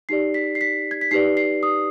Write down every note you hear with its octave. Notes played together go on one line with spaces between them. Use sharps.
D#4 G4 D5 C7
B6
C7
B6
G#6
B6
D#4 G4 B4 D5 C7
C7
D#6